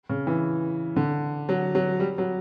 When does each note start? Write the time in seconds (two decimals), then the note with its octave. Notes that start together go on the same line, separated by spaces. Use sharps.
0.10 C#3
0.27 E3
0.96 D3
1.49 F#3
1.75 F#3
2.00 G3
2.18 F#3